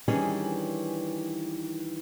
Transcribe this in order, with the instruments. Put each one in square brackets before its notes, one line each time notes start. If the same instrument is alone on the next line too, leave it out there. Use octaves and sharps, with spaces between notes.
[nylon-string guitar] D#3 E3 G3 C#4 D4 G#4